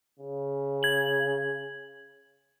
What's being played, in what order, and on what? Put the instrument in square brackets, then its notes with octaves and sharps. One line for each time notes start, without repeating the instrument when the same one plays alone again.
[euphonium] C#3
[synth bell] G#6 F#7